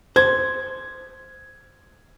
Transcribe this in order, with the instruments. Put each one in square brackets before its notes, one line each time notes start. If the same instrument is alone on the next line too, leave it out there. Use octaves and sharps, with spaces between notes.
[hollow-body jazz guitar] C5 [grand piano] G#6